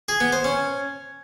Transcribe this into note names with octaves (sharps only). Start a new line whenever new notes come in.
G#4
B3
C5
C#4